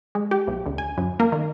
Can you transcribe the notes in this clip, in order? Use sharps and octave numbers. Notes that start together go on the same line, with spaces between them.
G#3
G4
B1
D2
G#5
F#2
A#3
D#3